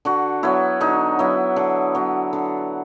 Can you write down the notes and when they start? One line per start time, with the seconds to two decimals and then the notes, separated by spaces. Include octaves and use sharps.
0.05 D3 F#4
0.43 F#3 B3 E4
0.81 D3 D#4
1.19 F#3 B3 E4
1.56 D3
1.95 F#3 B3
2.33 D3